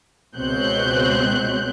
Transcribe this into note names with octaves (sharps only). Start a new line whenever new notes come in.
C#2 B2 C4 C#5 F#6 G6